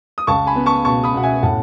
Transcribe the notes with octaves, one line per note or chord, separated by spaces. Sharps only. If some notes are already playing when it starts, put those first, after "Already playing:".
D#6
C#2 A5 C#6
G#5 B5
B3
A5 C#6
B2 A5 C#6
B5 D#6
B2 F#5
E5 G#5
A2 F#5 A5